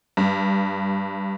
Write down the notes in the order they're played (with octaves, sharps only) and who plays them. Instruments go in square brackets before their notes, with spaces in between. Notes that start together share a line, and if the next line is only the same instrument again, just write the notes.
[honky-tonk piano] G2